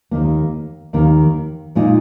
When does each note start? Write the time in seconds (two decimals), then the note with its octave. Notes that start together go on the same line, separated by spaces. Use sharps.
0.11 D#2 D#3 A#3
0.93 D#2 D#3 A#3
1.75 A#2 G#3 D#4